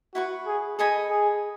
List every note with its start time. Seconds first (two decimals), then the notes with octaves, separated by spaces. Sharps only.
0.15 E4 F#4 B4 F#5 C#6
0.47 G#4
0.78 G#4 A4 D#5 G#5 B5
1.09 G#4